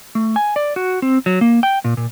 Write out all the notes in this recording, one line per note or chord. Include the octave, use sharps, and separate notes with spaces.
A3
G#5
D5
F#4
C4
F#3
A#3
G5
A#2
A#2